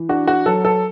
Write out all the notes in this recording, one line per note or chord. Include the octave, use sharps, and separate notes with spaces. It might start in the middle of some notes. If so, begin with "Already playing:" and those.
Already playing: E3
D4 F#4
F#4
F#3 A4
A4